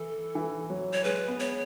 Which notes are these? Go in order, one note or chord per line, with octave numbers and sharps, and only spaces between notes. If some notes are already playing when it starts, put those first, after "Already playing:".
Already playing: E3 A4
E3
F#3
C#5
G#3 B4
B3
C#5